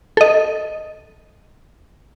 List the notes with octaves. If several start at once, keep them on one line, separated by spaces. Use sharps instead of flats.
A4 D#5